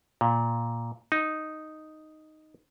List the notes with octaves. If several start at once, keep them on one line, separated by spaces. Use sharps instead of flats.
A#2
D#4